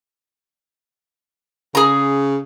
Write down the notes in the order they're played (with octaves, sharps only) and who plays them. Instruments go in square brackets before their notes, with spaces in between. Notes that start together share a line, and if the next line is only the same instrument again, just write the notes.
[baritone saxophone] C#3 [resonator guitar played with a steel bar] G#4 A#5